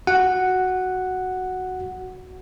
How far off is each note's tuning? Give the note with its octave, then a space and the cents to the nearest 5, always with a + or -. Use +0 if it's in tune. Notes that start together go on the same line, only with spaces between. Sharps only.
F#4 +0 F#5 +0